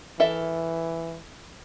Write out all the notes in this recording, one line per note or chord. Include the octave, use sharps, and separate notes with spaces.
E3 A4 A#4 E5